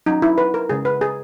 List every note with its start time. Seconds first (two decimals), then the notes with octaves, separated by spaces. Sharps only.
0.06 F#3 C#4 D#4
0.22 E4
0.38 B4
0.54 A#4
0.70 C#3 G#3 C#4 G#4
0.85 B4
1.01 G#4